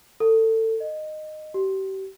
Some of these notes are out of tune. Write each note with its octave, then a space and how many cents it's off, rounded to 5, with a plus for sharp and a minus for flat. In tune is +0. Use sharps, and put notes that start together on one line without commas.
A4 +25
D#5 -15
G4 -35